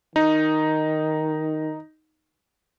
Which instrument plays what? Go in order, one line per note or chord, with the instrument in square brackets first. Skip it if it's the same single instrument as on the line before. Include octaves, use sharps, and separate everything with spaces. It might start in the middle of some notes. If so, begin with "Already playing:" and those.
[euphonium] D#3 [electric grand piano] D#4